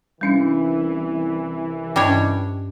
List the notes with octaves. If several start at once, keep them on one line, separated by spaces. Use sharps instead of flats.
C2 E3 G3 C#4 D4
G2 G3 C#4 D4 C#5 D#5